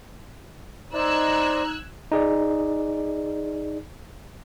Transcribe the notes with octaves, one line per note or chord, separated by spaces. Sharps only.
D#4 C5 D5 A#5 E6 F#6 G#6
D#4 G#4 D5